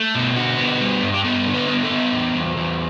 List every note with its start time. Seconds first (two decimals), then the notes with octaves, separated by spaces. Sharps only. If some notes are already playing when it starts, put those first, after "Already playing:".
Already playing: A3
0.15 B2
0.36 D3 F#4
0.58 B3
0.81 G3
1.03 G2
1.14 G4
1.24 B3 A4
1.46 D3
1.54 B4
1.68 B3
1.83 A4
1.90 B3
2.13 E2
2.35 E2
2.57 E2